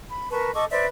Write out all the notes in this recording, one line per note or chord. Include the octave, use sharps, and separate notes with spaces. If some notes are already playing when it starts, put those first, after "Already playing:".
B5
A#4 B4 A5 C#6
A4 D#5 C#6 D6
B4 C5 D5 E5